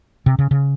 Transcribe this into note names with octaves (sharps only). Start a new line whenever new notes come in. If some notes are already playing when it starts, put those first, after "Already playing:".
C3
C#3
C#3